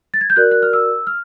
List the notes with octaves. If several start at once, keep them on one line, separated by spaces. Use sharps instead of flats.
A6
G#6
G6
F#4 A#4 D5 F#6
F#6
F6
E6
F6